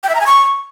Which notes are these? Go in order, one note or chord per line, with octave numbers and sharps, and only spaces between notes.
G5
E5
A#5
G#5
C#6